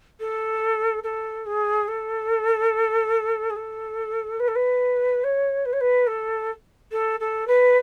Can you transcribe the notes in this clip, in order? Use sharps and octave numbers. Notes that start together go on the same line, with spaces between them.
A4
A4
G#4
A4
G#4
A4
B4
A4
B4
C#5
B4
C#5
B4
A4
A4
A4
B4